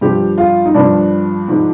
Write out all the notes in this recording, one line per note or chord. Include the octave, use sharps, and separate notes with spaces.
G2 F3 G4
F4
D#4
G2 F3 D4
G#2 F3